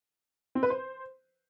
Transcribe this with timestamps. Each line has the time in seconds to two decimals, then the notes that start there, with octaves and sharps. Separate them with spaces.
0.55 C4
0.63 B4
0.70 C5